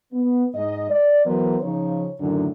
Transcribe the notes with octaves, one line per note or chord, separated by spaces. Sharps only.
B3
G#2 D#5
D5
E3 F#3 B3 A#4 C5
C#3 F3 D#4 C#5
F#2 A2 D3 D#3